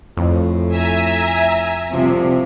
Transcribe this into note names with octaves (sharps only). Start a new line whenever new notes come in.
F2 A2
E5 G#5 A#5
C2 C3 F3